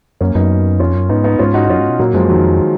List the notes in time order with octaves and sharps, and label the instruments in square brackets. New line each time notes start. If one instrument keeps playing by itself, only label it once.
[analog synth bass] F#2 [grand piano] A#3 C#4
[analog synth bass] F#2 [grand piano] B3 D#4
[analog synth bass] F2 [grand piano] C#4 F4
[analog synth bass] F#2
[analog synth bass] G#2 [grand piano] B3 D#4
[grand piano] B3 D#4
[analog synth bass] G#2 [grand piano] C#4 F4
[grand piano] D#4 F#4
D#4
[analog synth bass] F#2 [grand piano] C#4 F4
[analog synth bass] G#2
B2
[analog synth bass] A#2 [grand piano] F#3 A#3
[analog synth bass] F#2 [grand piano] F3 G#3
[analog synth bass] F2 [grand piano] D#3 F#3